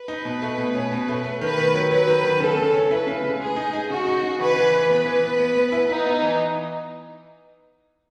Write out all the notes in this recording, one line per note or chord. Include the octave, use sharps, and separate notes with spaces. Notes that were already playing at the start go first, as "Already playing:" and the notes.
Already playing: B4
D#4
B2
A3
B2
C#4
B2
A3
A3
D#3 B4
D#3
F#3
F#3 B4
D#3
D#3
C#3 A4
C#3
C#4
E4 B4
C#3
C#3
G#3 G#4
D#4
D#4
C#3 F#4
D#4
C#3
E3 B4
E3
E3
B3 B4
E3
B3
B3
B3
E4
D#4 E4
B3
E3